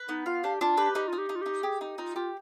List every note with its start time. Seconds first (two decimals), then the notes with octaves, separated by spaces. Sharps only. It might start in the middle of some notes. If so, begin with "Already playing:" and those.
Already playing: B4
0.09 B3 D#4
0.26 F4 F5
0.44 D4 G4
0.61 D4 F4
0.77 G4 B4
0.95 D#4 G4
1.08 D#4 F4
1.18 G4
1.29 D#4
1.36 F4
1.41 D#4 G4
1.63 G4 G#4
1.81 D#4 G4
1.98 D#4 F4
2.16 F4 G4